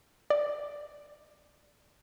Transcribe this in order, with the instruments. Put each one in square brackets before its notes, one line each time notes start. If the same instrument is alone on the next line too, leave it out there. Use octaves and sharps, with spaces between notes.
[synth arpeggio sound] D5